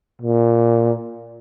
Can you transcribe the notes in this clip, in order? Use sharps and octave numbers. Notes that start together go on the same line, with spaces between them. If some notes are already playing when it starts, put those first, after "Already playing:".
A#2